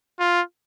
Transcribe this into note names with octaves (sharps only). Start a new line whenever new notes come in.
F4